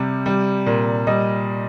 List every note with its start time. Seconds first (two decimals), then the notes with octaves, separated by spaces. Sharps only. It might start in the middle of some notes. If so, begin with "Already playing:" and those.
Already playing: C3 G3
0.26 G3
0.66 A#2
1.07 G3 D#5